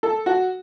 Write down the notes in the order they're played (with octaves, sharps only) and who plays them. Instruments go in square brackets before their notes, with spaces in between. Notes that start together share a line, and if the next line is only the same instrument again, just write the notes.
[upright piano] A4
F#4